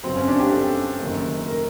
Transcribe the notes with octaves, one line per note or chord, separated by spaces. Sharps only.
G1 F#2 C#3 F#3 C4
C#4
D4
G4
A4
F#1 F#2 D#3
A#4